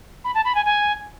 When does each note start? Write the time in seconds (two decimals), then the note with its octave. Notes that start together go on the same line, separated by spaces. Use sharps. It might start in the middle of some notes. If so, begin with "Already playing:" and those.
0.24 B5
0.35 A5
0.45 B5
0.55 G#5
0.65 G#5